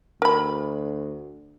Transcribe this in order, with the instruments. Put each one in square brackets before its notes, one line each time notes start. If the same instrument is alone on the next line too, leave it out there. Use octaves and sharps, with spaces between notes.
[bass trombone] D2 [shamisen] A#4 B5